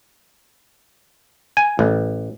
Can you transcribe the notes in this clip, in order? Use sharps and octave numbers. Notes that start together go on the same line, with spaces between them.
G#5
A1